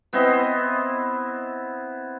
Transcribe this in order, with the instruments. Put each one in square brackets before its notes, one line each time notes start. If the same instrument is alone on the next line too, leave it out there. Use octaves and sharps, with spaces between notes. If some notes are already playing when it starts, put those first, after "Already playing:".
[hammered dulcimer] B3 C4 E4 D#5